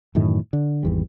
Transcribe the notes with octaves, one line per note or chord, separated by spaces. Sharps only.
F#2 A2 D#3 E3
D3
G#1 E2 G3